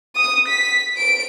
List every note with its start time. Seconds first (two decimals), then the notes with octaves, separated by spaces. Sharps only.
0.15 D#6
0.47 B6
0.97 D7